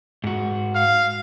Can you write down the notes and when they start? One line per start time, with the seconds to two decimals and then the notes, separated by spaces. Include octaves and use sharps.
0.24 G#2 F#4
0.76 F5